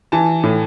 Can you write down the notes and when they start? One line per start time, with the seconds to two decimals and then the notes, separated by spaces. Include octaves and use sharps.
0.12 E3 A5
0.43 A2